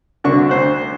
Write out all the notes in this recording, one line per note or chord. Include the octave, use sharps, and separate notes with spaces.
C2 D3 D4 F#4 C#6
D2 C5 F#6